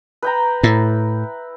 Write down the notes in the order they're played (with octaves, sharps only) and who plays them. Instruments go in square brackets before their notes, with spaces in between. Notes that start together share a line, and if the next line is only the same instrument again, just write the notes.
[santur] B4 G5 A#5
[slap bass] A2 [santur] E4